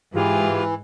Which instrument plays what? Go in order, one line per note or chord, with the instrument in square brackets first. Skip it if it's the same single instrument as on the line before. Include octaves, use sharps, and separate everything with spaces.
[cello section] G#2 [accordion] E3 [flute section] F4 G4 G#4